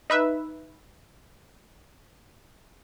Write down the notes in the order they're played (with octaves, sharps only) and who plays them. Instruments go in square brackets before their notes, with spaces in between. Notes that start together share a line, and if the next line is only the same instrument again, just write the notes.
[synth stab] D#4 B4 E5